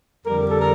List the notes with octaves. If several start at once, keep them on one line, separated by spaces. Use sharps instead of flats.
F2 D3 G3 A#4
A4
A#4